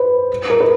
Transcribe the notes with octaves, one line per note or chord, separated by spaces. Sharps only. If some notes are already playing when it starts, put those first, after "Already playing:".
Already playing: B4 C5
A#4
B4